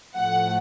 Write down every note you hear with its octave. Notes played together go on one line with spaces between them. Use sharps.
A2 F3 A3 F#5